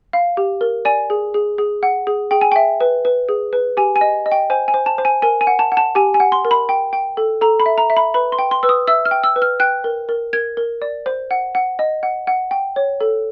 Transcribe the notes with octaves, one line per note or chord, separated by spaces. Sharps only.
F5
G4
A#4
D5 G#5
G#4
G#4
G#4
F#5
G#4
G#4 G5
G#5
E5 G5
B4
B4
G#4
B4
G4 G#5
G#5
D#5
D#5
G5
C5 G#5
G#5
C5
A5
C5
G#5
A#4 G#5
G#5
F#5
A5
F#5
A5
G4 G#5
G#5
F#5
C6
A#4
B5
G5
G5
A4
A4 A#5
B5
E5
A#5
E5
B5
B4 B5
C6
G5
C6
B4 E6
D#6
E5 E6
F6
G5
E6
B4
F6
G5 F#6
A#4
A#4
A#4 G#6
A#4
D5
C5
F#5
F#5
D#5
F#5
F#5
G5
C#5
A4